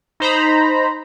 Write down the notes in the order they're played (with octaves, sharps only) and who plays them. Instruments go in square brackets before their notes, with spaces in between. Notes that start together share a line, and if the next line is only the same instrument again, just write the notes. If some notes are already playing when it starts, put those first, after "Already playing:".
[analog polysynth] D#4 C5 A#5 B5